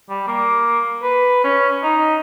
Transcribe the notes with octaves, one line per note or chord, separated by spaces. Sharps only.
G3
A#3
B4
C#4
D#4